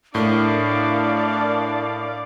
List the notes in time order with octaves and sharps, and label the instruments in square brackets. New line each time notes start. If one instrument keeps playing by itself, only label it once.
[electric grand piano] A2 [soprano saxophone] D4 [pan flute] A#4 [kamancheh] D5 F5